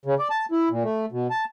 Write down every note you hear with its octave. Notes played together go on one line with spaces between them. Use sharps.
C#3
D5
A5
E4
A#2
A3
B2
A5